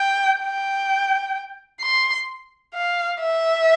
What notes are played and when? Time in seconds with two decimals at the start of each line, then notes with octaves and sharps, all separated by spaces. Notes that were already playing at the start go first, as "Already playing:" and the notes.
Already playing: G5
0.40 G5
1.81 C6
2.74 F5
3.20 E5